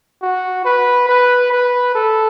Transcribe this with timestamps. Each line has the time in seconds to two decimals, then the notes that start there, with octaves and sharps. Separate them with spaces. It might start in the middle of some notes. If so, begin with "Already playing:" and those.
0.22 F#4
0.65 B4
1.09 B4
1.52 B4
1.95 A4